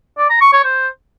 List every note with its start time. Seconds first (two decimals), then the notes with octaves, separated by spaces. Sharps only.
0.18 D5
0.30 A#5
0.41 C#6
0.53 C#5
0.64 C5